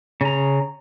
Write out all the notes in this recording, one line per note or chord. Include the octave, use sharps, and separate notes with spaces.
C#3 A#5